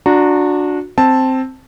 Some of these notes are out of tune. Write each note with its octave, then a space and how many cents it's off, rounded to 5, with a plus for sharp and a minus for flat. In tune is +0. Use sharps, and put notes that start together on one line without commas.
D4 +0 F#4 -25 A#5 -15
C4 +0 A5 +0